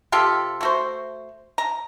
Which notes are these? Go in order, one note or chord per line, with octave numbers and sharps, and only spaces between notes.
C3 F4 G4 A4
A3 F#4 C5
A#5